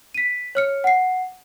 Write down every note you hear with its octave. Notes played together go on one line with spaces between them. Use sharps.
B6 D#7
C#5 F6 C#7
F#5 C7